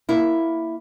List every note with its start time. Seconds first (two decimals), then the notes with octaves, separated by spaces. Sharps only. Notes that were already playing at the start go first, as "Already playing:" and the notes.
0.09 A#3 E4